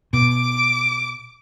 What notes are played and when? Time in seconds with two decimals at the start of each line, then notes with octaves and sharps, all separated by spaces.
0.13 B2 D6